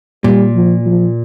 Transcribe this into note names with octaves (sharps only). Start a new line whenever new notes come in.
A#2 G3
F3
F3